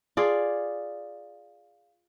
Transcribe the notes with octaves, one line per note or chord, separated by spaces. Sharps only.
F4 G#4 D5